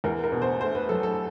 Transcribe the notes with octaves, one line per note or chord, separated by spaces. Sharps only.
E2 A#4
A#4
B2
C5
A3 C5
B4
F#3 A4
A4